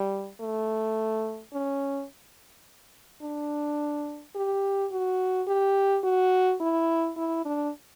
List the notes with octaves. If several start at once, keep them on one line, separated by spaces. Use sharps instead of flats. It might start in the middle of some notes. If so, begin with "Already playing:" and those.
Already playing: G3
A3
C#4
D4
G4
F#4
G4
F#4
E4
E4
D4